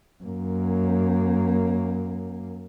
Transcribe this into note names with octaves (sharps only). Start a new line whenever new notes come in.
F#2 A#3